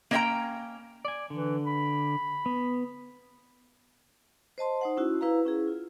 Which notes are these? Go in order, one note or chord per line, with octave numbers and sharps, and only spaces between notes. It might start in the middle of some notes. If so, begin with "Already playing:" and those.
A#3 C#4 D#5 E5 G5 A#5
D5 G#5
D3 E3
B5
B3
C5 D#5 A5 C6
D#4 C5 F#5
C#4 E4 F#4
E4 B4 F5 A#5
C#4 E4 G#4
F4